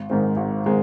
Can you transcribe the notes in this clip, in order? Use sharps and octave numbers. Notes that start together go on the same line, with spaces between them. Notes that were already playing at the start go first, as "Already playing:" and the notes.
Already playing: G#1
G#2 D#3 G#3 C4
G#1
D#3 G#3 C4